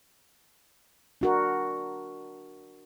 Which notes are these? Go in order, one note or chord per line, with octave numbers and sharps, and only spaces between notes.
D4 F#4 A#4